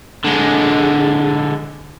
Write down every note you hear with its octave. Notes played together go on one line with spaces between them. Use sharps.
D3 G#3